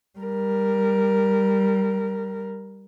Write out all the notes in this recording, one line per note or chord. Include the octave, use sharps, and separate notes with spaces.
G3 A#4